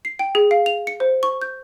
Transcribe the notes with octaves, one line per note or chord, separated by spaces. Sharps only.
C7
G5
G#4
F5
F7
C#7
C5
C#6
G6